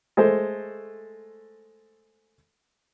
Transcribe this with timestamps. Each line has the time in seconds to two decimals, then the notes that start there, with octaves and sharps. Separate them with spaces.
0.17 G#3 A3 C5